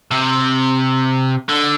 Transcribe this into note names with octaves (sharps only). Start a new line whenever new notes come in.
C3
D3